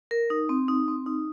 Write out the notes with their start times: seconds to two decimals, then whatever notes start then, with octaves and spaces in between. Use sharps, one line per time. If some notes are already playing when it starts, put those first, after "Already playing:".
0.11 A#4
0.30 D#4
0.49 C4
0.68 D#4
0.88 C4
1.06 D#4